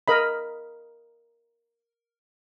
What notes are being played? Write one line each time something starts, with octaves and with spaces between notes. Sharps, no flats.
A#4 D#5 B5